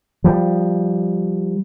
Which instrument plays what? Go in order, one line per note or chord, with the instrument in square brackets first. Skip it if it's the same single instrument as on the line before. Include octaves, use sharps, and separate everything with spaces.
[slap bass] F3 G3